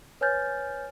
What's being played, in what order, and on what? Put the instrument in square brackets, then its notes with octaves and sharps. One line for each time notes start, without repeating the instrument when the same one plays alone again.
[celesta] B4 C#5 G#5 F6 G6 A6